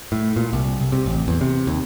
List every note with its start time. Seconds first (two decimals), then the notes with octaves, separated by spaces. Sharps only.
0.12 A2
0.36 A#2
0.53 C2
0.80 C2
0.92 C3
1.06 A1
1.28 E2
1.41 C3
1.67 D#2